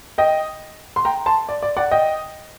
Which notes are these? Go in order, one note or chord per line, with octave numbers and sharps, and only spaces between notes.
D#5 G5
C6
G5 A#5
A5 C6
D5
D5
D5 F#5
D#5 G5